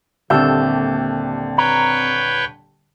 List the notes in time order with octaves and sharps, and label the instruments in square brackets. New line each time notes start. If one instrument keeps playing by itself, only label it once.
[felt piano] D#1 D3 G4 [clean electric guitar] A#3 E5 [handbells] C4 A5 G6
[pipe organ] B4 C#5 G5 [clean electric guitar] A#5